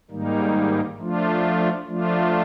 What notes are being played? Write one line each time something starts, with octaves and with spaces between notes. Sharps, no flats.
G#2 D#3 G3 A#3 D#4
F3 A3 D4 F4
F3 A3 D4 F4